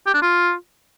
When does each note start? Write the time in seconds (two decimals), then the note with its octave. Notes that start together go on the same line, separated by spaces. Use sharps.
0.06 G4
0.14 D4
0.22 F4